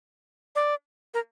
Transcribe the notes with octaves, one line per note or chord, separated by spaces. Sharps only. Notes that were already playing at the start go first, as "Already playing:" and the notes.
D5
A#4